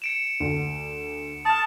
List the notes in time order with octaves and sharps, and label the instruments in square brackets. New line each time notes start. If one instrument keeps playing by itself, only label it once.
[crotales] C#7 D7 E7
[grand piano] D2
[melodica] A5 [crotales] D#6 F6